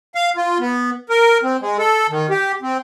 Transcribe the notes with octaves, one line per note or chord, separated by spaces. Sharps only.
F5
F4
B3
A#4
C4
G#3
A4
D#3
G4
C4